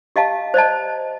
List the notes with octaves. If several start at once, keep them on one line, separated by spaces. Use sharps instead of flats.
G4 D#5 F5 A5
C5 D5 D#5 A5